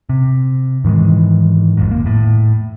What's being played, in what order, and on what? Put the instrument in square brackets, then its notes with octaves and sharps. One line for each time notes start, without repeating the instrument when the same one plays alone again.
[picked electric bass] C3
G#2 D#3 E3 G#3
A#1 F2 G#2
F1 A#3
A2